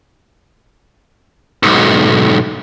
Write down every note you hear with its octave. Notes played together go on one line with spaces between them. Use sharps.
B1 G#2